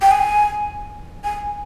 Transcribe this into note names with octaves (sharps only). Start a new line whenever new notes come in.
G5
G#5
G#5